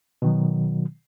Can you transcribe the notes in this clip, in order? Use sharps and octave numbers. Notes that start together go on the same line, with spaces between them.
B2 D#3 F#3